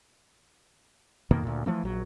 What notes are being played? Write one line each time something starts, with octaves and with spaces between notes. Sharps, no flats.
F2 B2 D#3 A#3
D2 A#2
E3 F3 A3 B3
A#1 F#3